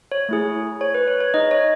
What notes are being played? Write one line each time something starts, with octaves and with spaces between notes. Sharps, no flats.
C#5
A3 E4 G#4
C#5
B4
C#5
C#5
D#4 G#4 D#5
C#5